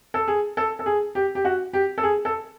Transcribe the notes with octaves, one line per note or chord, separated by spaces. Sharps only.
A4
G#4
A4
A4
G#4
G4
G4
F#4
G4
A4
G#4
A4